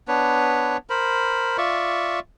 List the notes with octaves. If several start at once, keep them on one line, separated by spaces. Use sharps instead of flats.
B3 D4 B4 C#5
A#4 C5 B5
F4 D5 E5 C#6